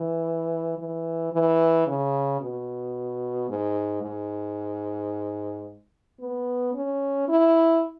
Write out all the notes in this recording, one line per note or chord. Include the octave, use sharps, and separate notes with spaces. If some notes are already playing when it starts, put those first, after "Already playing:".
Already playing: E3
E3
E3
C#3
B2
G#2
G#2
B3
C#4
E4